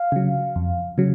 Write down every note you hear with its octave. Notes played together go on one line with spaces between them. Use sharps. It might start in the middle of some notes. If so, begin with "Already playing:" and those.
Already playing: F5
C#3 F#3
F2
C#3 F#3